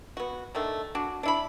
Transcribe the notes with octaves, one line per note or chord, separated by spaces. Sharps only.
B3 F#4
D3 D#3 A3
D4 F#4
D4 E4 B5